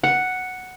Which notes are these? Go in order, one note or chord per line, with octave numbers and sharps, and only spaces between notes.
F#5